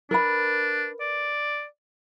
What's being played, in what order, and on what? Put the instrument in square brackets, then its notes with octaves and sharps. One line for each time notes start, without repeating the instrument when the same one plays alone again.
[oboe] D4 [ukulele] A#4 B4 B5
[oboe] D5